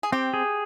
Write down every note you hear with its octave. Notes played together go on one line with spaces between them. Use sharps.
G#4
C4 G4
G#4